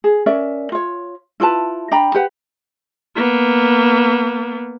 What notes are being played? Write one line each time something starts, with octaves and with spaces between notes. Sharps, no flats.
G#4
C#4 A#4 D5 E5
F4 C#5
E4 F4 B4 A5
D4 G5 A#5 B5
G4 B4 F#5
A#3 B3